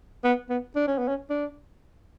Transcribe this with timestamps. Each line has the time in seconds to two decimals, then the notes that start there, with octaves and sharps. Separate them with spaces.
0.24 B3
0.50 B3
0.76 D4
0.88 C#4
0.98 B3
1.08 C#4
1.30 D4